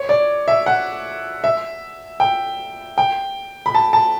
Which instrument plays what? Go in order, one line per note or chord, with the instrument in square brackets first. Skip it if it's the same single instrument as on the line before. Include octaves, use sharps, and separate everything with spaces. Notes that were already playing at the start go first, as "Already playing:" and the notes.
Already playing: [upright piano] C#5
D5
E5
F#5
E5
G5
G5
B5
A5
A5